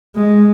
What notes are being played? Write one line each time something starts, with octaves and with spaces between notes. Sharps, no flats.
G#3